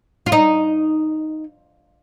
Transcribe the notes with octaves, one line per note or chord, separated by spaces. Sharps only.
F4
D#4